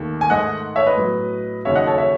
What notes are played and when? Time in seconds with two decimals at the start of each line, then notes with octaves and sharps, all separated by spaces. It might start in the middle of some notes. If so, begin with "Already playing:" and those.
Already playing: D#2 D#3 A3
0.21 G#5
0.30 G#2 D#3 A3 D#5 F#5
0.76 C#5 E5
0.86 B4 D#5
0.97 A2 F#3 B3
1.65 D#2 C#3 F#3 C#5 E5
1.75 D#5 F#5
1.87 A4 C#5
1.98 C#5 E5